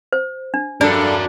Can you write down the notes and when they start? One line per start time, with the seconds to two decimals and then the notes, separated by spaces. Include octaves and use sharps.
0.12 C5
0.54 D4
0.81 G2 D4 F#4 A4 A#4 D5